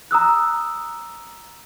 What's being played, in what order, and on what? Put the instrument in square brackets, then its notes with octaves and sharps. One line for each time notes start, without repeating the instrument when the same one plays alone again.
[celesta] A#5 D#6 E6 F#6